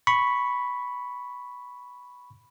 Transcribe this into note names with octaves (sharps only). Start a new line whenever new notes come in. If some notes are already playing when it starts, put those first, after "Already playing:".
B5 C#6